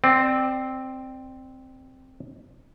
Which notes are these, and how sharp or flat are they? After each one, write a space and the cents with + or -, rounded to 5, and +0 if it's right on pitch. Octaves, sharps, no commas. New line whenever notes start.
C4 +0 D5 +30